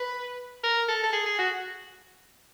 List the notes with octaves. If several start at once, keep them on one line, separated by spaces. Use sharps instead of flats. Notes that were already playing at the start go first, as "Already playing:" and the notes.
Already playing: B4
A#4
A4
A4
G#4
G#4
F#4